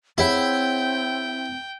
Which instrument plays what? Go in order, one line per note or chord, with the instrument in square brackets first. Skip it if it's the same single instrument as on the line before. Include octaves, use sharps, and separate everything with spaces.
[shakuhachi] C4 [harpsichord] E4 [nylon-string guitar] G#4 C#5 F#5 [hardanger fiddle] G5